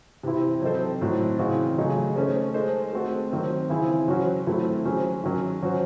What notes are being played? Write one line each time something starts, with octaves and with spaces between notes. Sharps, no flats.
C3 E3 C4 E4
F#3 C4 D#4 A4 C5
A2 F#3 C4
C#3 E3 C4 D#4 F#4
C#3 F#3 A3 D#4 G#4
A3 C#4 G#4 C5
G#3 D#4 A4 C5
A3 C4 F#4 A4
D#3 F#3 C4
C#3 E3 C4 E4 G#4
F#3 C#4 F#4 C5
F#3 A3 C4 E4
F#3 C#4 G#4 C5
D#3 F#3 C#4
F#3 C#4 F#4 C5